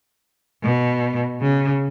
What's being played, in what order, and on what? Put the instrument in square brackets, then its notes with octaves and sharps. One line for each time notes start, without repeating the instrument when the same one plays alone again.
[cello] B2
C#3